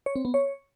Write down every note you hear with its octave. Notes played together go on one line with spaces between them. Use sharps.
C#5
C4
B3
C#5